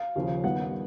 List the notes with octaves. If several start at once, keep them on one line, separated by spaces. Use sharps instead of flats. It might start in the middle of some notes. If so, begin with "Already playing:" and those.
Already playing: F5
D#2 C#3 F3
G2 D#3 G3 B3 F#5